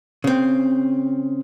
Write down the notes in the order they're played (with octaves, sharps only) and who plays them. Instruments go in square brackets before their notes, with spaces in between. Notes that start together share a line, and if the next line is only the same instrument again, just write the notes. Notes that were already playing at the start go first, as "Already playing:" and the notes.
[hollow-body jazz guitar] C#3 C4